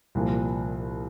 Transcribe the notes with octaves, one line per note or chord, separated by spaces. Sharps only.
C2 A#2 F3